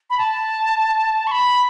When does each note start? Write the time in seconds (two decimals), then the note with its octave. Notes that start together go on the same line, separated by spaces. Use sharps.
0.10 B5
0.18 A5
1.27 C#6
1.31 B5